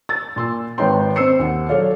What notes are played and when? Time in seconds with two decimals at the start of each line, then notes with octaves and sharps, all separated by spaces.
0.09 E6 A6
0.36 A#2 C6 E6
0.78 G#1 D#4 B4 C#5 G5 C6
1.16 C4 C5 E6 C7 C#7
1.39 D#2 F#5
1.69 F#3 A4 C#5 D5 F5